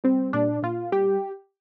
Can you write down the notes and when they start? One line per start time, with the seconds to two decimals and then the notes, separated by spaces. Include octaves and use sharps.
0.04 G3 C4
0.33 A#2 D4
0.63 A#2 F4
0.92 G3 G4